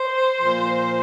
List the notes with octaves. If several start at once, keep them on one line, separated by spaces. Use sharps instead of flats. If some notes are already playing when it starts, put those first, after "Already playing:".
Already playing: C5
A#2 F3